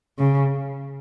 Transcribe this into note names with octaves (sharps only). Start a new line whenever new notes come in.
C#3